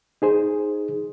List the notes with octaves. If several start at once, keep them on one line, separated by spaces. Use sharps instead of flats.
D#4 G#4 C5